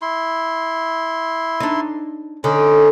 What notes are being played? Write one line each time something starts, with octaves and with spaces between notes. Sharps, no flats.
E4 C6
D4 D#4
D3 C#4 D#4